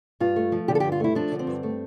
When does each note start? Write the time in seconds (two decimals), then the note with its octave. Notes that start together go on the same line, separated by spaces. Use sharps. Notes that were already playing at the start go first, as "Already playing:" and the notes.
0.20 G2 F4
0.36 A3
0.52 F3
0.68 D3 G4
0.75 A4
0.80 G4
0.84 G2
0.92 F4
1.00 A3 E4
1.15 F3 D4
1.32 D3
1.39 C4
1.47 G2
1.63 A3